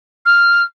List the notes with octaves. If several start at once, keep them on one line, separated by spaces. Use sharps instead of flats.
F6